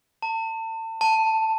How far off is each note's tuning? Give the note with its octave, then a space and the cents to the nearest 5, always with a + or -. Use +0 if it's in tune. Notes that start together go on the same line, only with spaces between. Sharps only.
A5 +35
A5 +10